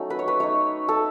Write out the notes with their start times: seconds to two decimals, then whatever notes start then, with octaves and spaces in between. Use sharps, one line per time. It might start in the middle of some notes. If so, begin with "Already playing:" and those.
Already playing: F#3 A3 C#4 D#4 A4
0.10 B4
0.19 C#5
0.28 B4
0.40 A3 D#4 C#5
0.89 A4